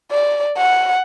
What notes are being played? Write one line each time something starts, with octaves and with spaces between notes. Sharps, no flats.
D5
F#5